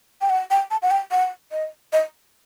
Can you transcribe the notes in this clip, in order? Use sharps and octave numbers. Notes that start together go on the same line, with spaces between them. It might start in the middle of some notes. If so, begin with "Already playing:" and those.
G5
F#5
G5
A5
F#5
G5
F#5
D#5
D#5